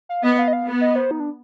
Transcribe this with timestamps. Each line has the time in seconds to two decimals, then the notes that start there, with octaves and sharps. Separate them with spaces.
0.09 F5
0.23 B3 D#5
0.38 F5
0.48 D#5
0.53 F5
0.67 B3
0.81 D#5
0.96 C5
1.11 D#4
1.20 D4